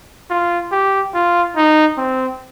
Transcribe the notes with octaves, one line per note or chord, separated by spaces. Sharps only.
F4
G4
F4
D#4
C4